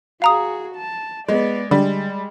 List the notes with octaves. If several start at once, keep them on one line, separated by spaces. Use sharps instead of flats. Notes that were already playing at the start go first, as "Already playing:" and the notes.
F#4 G#4 F5 A#5 D#6
A5
G#3 B3 D5
D3 G3 G#3